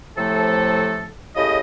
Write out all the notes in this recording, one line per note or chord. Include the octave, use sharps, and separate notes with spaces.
A2 C3 F3 A3 A4
A2 C#3 E4 G4 D#5